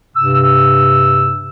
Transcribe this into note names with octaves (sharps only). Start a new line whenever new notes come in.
G2 C3 E6